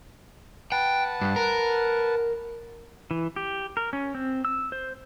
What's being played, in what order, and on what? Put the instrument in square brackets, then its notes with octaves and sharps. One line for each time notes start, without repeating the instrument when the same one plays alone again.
[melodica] B4 F#5 A5 [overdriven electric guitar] G5
[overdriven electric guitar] G2
A#4
[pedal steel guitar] E3
G4
A#4
C#4
C4
E6
C5